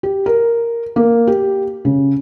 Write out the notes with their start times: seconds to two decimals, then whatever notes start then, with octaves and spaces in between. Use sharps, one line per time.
0.03 G4
0.26 A#4
0.96 A#3
1.27 G4
1.85 C#3